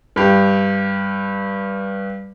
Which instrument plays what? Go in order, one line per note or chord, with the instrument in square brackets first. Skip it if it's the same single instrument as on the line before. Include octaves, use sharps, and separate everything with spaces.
[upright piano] G2 G4